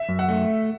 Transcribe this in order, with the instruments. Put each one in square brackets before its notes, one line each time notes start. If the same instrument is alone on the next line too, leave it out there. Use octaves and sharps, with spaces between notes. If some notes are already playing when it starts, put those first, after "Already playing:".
Already playing: [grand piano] E5
[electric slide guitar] F#2
[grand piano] F#5
[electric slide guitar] A3